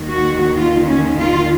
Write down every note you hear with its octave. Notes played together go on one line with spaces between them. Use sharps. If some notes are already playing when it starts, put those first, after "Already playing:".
Already playing: D#2 D#3
F#4
F4
C#4
F4